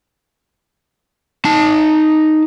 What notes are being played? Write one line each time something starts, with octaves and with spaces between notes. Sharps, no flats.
D#4 A5